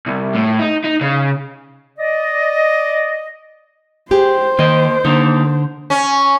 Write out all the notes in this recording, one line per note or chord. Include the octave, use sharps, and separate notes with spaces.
C2
A2
D#4
D#4
C#3
D5 D#5
G#3 G4 G#4 C5
D#3 A#3 D#5
D3 A#3 D#4
C#4